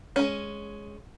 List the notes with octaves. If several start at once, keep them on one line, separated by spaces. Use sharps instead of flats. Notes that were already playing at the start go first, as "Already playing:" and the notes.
G#3 C#4